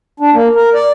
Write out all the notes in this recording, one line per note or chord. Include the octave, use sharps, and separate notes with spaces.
D4
A#3
A#4
D5